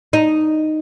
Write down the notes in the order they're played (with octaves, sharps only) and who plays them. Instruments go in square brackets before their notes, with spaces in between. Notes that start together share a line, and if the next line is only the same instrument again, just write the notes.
[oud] D#4